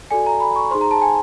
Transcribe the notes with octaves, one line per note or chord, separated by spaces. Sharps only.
F#4 A4 D5 G#5
A#5
B5
C#6
D#4 G#4 C5 C6
A#5
A5
G#5